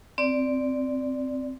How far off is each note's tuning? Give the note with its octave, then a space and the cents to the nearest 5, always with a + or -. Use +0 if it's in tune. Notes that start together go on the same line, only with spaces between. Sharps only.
C4 -5 D5 +0